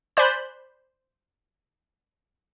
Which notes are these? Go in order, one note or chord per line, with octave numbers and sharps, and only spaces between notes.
C5 D5 G#5 B5 F#6 G6